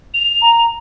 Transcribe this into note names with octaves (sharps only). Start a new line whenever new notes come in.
F7
A#5